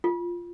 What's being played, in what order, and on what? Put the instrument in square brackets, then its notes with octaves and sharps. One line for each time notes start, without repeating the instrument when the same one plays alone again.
[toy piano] F4